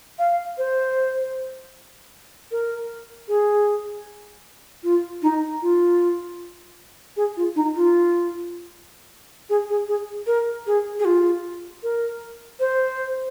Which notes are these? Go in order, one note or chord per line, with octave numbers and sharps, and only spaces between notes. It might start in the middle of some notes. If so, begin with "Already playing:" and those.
F5
C5
A#4
G#4
F4
D#4
F4
G#4
F4
D#4
F4
G#4
G#4
G#4
A#4
G#4
G#4
F4
A#4
C5